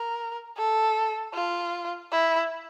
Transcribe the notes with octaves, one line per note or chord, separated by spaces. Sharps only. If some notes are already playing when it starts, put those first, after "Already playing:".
Already playing: A#4
A4
F4
E4